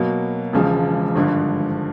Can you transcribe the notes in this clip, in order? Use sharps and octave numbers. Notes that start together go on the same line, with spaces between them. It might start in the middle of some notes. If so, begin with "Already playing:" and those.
Already playing: B2 F#3 A#3
E1 E2 C#3 F3 G#3
G#1 G2 D3 F3